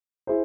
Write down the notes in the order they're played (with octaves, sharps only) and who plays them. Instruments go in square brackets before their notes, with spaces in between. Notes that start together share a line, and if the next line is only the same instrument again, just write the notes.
[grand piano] E4 G#4 C5